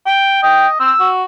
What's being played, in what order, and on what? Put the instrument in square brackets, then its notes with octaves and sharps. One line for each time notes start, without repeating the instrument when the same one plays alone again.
[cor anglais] G5
[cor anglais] D#5 [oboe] G5
[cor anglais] C4 [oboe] E6
[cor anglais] F#4